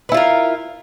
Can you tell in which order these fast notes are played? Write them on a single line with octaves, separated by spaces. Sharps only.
B4 E4 F4 A#4